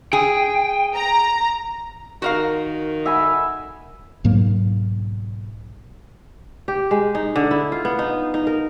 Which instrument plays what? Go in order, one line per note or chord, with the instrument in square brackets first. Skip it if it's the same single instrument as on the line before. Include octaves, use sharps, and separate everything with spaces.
[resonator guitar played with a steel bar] G#4 [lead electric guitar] G5
[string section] A#5
[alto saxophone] D#3 [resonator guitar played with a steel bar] F#4 A#4 F5
[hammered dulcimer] E5 G#5 B5
[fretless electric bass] B1 G#2 F#3 A#3
[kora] G4
G#3
D#4
D3
E4
F4
B3
D#4
D#4
A#4